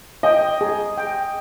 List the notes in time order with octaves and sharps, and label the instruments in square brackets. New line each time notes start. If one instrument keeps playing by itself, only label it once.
[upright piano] D#5 [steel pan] G5
[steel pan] G#4
G5